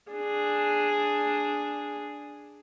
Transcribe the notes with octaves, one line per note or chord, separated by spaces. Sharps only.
D4 G#4